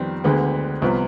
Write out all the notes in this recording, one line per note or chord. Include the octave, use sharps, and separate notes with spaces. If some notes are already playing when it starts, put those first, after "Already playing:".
Already playing: F2 D#3 G3 B3 C4
D2 D3 G#3 B3
C2 C3 F3 B3